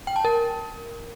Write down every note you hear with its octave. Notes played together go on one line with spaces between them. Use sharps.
G5
A5
A#4